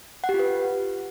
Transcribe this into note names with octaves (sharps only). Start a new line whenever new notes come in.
F#5
G4
F4
B4